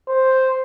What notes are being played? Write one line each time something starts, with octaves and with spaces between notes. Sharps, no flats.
C5